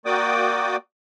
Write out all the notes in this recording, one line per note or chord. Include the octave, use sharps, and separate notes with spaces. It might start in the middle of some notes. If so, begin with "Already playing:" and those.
A#3 F#4 D5 G5 D6 D#6